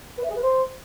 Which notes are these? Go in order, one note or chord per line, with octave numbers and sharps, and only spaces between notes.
B4
E5
G#4
B4
C5